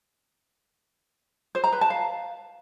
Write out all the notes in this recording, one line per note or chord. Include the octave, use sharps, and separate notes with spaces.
C5
A#5
B4
A5
F5